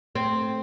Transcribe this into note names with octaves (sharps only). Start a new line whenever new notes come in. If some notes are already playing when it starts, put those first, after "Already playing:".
A3 C4